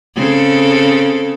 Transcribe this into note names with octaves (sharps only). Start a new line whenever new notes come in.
C#3 C4 A4